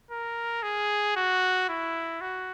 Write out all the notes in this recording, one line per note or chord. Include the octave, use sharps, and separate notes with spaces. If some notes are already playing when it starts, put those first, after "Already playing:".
A#4
G#4
F#4
E4
F#4